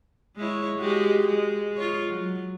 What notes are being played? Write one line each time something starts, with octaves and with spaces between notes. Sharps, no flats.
G#3 E4 C#5
G#3 F#4 G4
G#3
F4 C#5
F#3